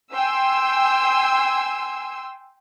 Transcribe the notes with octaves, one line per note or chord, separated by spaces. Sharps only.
G5 G#5 C6 E6